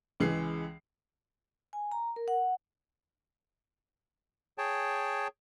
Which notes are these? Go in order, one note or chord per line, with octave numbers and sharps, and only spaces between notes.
C#2 E3 G#3 C7
G#5
A#5
A#4
F#5
G#4 C#5 G5 A5